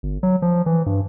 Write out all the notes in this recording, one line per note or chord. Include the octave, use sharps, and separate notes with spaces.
G1
F#3
F3
E3
G2